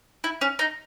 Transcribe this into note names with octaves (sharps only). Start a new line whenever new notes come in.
E4
C#4
D#4